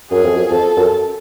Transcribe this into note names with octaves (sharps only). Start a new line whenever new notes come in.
F#2 G#4
F2
F#2
F2 A4
F#2